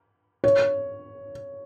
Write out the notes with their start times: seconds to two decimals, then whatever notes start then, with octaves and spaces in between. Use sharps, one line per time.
0.44 C#5